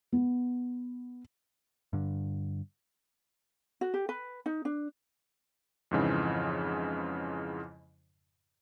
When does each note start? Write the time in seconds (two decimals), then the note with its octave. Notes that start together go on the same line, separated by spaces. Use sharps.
0.12 B3
1.93 G2 D3
3.81 F#4
3.94 G4
4.09 B4
4.46 D#4
4.65 D4
5.91 F2 G#2 C#3 E3